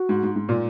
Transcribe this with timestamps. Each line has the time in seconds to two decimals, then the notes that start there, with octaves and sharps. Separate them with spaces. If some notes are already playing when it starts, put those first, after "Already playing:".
Already playing: F#4
0.09 G#2
0.23 G#2
0.36 G#2
0.49 A#2